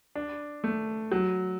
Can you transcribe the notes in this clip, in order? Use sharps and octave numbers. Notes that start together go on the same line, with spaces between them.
D4
A3
F#3